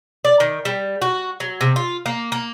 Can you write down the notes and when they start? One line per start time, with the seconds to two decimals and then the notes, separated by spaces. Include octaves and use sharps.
0.25 D5
0.40 D#3
0.65 G3
1.02 F#4
1.40 F#3
1.61 C3
1.76 F4
2.06 A#3
2.32 A#3